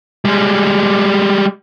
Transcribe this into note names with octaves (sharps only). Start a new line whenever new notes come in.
G3 G#3